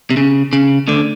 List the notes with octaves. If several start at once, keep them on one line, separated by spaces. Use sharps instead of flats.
C3
C#3
C#3
D2 D3